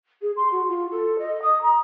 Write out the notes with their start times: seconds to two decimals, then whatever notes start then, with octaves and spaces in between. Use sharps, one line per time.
0.21 G#4
0.36 C6
0.51 F#4
0.68 F4
0.91 A4
1.18 D#5
1.42 D#6
1.61 A#5